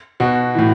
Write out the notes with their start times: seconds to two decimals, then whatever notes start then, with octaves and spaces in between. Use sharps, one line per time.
0.20 B2 F#4
0.55 A2 E3